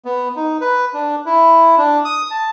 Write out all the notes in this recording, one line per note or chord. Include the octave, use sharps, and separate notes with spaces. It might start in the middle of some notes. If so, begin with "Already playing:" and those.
B3
D#4
B4
D4
E4
D4
D#6
A5